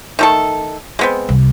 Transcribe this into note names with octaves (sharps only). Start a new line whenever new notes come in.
D#3 A3 A4
G#3 B3 C4
C2